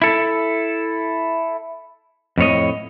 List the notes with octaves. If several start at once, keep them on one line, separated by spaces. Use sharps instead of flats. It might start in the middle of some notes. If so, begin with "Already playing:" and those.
E4 A4
F2 A2 C#5 D#5